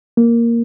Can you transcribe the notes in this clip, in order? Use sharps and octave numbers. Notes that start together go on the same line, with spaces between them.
A#3